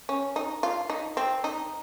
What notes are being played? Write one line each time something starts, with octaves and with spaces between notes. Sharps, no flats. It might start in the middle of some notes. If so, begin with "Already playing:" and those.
C#4
D#4
F4
D#4
C4
D#4